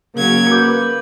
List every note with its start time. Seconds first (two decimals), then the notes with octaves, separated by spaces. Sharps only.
0.16 C#3 F#3 A#3 G#6
0.52 B4 D6 G6